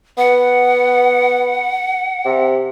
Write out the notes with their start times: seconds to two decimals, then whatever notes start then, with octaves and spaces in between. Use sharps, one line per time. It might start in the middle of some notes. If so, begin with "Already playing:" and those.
0.18 B3 F#5
2.26 C3